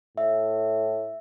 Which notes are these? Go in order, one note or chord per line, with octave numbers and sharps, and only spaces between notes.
A2 E5